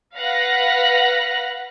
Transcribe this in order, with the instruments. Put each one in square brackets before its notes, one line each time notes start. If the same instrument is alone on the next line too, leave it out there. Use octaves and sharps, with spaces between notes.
[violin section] B4 F5 F#5 F#6 A#6 B6